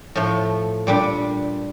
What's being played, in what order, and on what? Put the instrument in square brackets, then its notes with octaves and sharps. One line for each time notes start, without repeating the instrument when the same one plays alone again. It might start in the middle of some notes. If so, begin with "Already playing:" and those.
[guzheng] A2 F3 A3
A#2 G3 D4